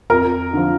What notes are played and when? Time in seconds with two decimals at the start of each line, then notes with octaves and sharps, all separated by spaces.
0.10 F2 A#4 A#5
0.53 D3 F3